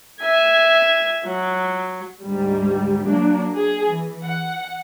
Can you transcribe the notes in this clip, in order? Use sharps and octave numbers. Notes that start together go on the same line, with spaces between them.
E5 G#5
F#3
D2 G#2 G3
F#3 A#3 D4
G#4
E3
F#5